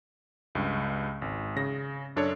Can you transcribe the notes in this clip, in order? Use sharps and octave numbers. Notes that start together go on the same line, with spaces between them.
C#2 G2
G#1
C#3 A#6
F#2 D4 A4 C#5